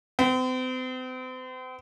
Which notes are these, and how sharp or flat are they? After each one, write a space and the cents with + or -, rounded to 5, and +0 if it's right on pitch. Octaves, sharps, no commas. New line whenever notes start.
C4 -40